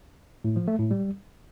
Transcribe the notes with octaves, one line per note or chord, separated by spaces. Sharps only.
A2
F3
A3
A2
G3